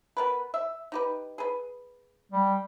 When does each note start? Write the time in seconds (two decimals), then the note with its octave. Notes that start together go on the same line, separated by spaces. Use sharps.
0.17 B3 A#4 B4
0.54 E5
0.92 D#4 G4 B4
1.38 G#4 B4
2.32 G3